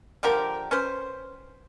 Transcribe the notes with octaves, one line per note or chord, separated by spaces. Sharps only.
D3 F3 G4 A#4
C#4 B4 C5